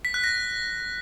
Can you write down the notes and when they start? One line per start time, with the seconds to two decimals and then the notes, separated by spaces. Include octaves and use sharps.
0.05 B6
0.14 F#6
0.24 A#6